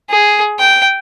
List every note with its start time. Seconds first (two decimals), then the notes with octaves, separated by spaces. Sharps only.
0.10 G#4
0.59 G5